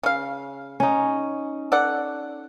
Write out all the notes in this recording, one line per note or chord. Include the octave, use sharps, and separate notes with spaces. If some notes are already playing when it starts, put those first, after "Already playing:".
C#3 F5
C#4 D#4
A4 D5 F#5